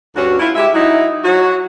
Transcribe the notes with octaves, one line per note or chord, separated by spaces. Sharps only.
D2 G2 C#4 F#4
E4 F4
G#3 G4 E5
F#3 D#4 E4
F#3 F#4